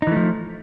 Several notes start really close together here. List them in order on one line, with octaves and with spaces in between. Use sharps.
D#4 E3 A3 F3